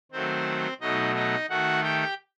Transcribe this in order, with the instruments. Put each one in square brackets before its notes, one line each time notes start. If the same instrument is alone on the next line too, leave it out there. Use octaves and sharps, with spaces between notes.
[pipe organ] D#3 F#3 A3 C4 C5
B2 F#3 A3 D#4 D#5
D#4 D#5
D#3 A3 F#4 F#5
G4 G5